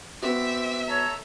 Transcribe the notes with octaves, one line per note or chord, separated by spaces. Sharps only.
B3 C4 F#4 E5 D6
A4 C#5 A#5